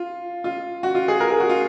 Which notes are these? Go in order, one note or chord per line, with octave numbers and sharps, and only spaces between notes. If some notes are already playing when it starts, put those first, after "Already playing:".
Already playing: F4
F4
F#4
F4
G#4
A#4
G#4
F#4
F4